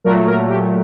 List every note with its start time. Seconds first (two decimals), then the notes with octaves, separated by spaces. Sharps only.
0.04 A#2 F#3 A3 A#4
0.27 A#4
0.49 G4